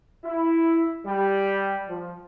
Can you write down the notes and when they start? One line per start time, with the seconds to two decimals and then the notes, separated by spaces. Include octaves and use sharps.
0.24 E4
1.05 G3
1.88 F3